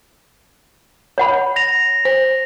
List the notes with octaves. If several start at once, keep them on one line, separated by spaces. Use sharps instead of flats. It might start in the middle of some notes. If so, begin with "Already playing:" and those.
C#5 F#5 B5
A#6 F7
C5